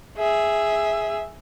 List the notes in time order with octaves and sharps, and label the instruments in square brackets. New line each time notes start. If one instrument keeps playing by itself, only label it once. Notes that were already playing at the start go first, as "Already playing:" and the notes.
[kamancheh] G#4 E5